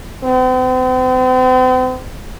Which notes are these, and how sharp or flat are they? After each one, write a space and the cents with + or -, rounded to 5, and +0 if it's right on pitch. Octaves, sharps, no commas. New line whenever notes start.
C4 -40